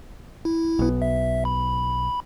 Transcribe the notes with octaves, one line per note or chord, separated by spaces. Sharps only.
E4
B1 B3
E5
B5